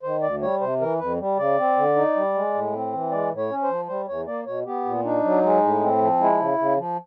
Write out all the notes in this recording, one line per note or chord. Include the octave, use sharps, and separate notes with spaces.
D#3 C5
D2 D5
G3 C#5
C3 C5
E3 A#4
F2 B4
G3
C#3 D5
C4
D3
D#4
G3
G#3
A2
C4
E3
G#3 D5
A2
C#5
C#4
C5
F3
G3 C5
E2 C#5
A#3 D5
B2 C#5
B3 G4
A#2
D4 D#4
F#3
G#3
A2
C4
F3
G#3 E4
C#3
C#3
F3